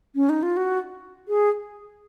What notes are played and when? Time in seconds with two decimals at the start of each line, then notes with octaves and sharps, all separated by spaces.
0.15 C#4
0.29 D#4
0.43 F4
0.57 F#4
1.28 G#4